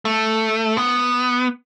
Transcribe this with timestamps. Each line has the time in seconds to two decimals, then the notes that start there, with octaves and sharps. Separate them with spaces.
0.05 A3
0.77 B3